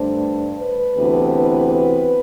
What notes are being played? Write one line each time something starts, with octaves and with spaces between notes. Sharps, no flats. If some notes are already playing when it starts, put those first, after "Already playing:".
Already playing: G2 D3 A3 D4 C5
B4
D2 C3 E3 B3
B4